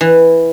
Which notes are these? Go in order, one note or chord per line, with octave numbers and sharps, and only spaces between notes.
E3